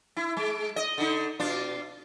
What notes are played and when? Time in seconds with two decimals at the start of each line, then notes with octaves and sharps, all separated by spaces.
0.17 E4
0.37 G#3
0.76 D#5
0.98 D3 D#4
1.40 B2 D4 F4